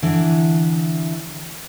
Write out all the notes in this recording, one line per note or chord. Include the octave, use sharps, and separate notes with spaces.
D3 E3